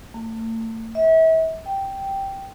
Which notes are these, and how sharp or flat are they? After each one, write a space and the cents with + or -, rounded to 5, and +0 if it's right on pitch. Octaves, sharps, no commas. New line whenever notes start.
A3 +40
E5 -35
G5 -5